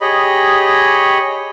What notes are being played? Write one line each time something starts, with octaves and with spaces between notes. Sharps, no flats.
G4 G#4 C#5 D#5 B5